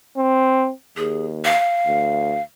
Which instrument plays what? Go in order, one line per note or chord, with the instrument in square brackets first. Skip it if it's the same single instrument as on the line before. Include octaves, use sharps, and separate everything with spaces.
[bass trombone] C4
[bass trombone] D#2 [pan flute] G#4
[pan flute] F5
[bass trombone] D2